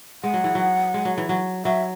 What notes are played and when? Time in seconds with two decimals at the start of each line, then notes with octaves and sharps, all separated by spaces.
0.23 G#3 F#5
0.34 F#3
0.44 E3
0.55 F#3
0.94 G#3
1.05 F#3
1.18 E3
1.29 F#3
1.65 F#3 E5